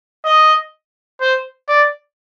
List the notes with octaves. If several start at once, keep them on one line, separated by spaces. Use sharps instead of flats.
D#5
C5
D5